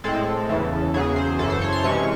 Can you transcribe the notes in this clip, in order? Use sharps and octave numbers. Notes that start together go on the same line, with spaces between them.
A2 G#3 C4 A4
E2 C#3 E3
E2 C#3 F#3 G#4
C5
F#2 C#3 E3 A4
C5
C#5
C6
C3 E3 G#3 C#4 C#6